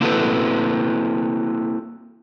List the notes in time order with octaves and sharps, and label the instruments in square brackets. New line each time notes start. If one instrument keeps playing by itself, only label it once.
[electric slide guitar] A#3 C4 E4 F#4 A4 B4